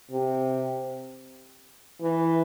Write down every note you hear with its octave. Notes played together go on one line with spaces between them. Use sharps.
C3
E3